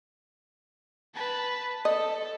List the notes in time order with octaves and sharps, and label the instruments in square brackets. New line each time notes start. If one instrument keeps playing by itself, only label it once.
[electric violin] B4 A5
[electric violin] A4 [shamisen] D#5